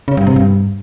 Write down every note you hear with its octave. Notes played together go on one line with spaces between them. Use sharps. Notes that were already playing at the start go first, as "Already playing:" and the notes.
C#3
G2
C3
G2